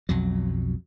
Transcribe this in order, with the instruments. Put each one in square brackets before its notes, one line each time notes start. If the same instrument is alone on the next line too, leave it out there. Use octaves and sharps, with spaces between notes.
[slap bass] B1 F2 F#3